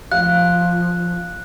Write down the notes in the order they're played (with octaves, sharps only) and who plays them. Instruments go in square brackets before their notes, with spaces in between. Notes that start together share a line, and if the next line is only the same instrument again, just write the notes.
[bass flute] F3 [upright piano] F5 [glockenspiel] F#6